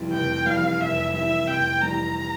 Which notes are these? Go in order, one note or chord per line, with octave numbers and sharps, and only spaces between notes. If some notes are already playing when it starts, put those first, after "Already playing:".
Already playing: F1 F2 E3 G3
F1 G5
F2 E3 G3 F5
F1 E5
F2 E3 G3 E5
F1 G5
F2 E3 G3 A#5